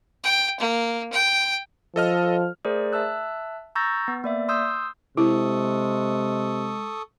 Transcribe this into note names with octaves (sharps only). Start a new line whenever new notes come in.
G5
A#3
G5
F3 A4 D#5 F6
A3 G#4 A#4 C5 D5
E5 A5 E6 F#6
A#5 C#6 E6 G6 A6 A#6
B3
A#3 D5 E5
C6 D#6 E6 G6
C3 G#3 E4 A4 C#6 D#6